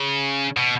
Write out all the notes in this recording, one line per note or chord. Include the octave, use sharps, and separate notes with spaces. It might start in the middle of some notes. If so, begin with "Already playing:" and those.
Already playing: C#3
B2